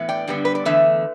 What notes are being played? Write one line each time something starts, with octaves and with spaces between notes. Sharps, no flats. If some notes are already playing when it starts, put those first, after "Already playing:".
Already playing: A2 E3 B3
D5 G5
G2 D3 G3 B3
B4
D5
E2 D3 A3 B4 E5